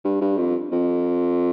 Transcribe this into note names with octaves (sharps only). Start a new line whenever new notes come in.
G2
G2
F2
F2